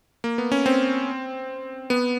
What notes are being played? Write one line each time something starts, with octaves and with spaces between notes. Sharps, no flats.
A#3
B3
C#4
C4
B3